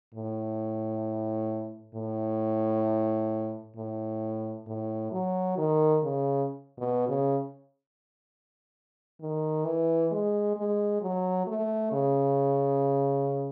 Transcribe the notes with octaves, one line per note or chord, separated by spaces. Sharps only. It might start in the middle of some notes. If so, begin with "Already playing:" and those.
A2
A2
A2
A2
F#3
D#3
C#3
B2
C#3
D#3
E3
G#3
G#3
F#3
A3
C#3